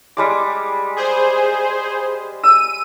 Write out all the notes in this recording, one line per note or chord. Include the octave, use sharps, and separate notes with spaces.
G3 G#3 D6
G#4 C5
E6 D#7